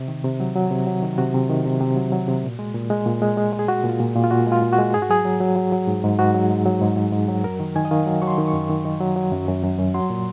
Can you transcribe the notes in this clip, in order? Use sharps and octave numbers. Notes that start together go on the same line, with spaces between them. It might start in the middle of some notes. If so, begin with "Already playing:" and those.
Already playing: C3
D#3
C3
F#3
F#3
C3
F#3
D#3
C3 F#4
C3
D#3
C3
C3
F#3
F#3
C3
A#2
G#3
A#2
G#3
A#2
G#3
G#3
G#3
G#4
G#3 F#4
A#2 F4
A#2
A#2
F4
A#2 F#4
G#3
F4
A#2
F#4
G#3
G#2 G#4
F#4
F#3 G#4
F#3
F#3
F#3
F#3
G#2
G#2
G#2 F#4
F#3
G#2
F#3
G#2
G#2
G#2
F#3
F#2 A#4
D#3
D#3 G#5
D#5
D#3 F5
F#3
F#3 C#6
C6
D#3
C#6
F#2
D#3
D#3
F#3
F#3
F#2
F#2
F#2
F#2
F#3 C6
A#2